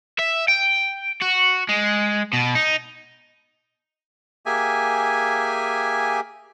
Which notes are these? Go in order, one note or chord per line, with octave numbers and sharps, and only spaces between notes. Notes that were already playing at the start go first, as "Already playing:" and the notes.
E5
G5
F#4
G#3
B2
D#4
A#3 G4 G#4 E5 G#5